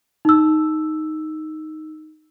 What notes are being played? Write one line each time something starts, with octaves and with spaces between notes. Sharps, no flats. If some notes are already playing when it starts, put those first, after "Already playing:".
D#4 E6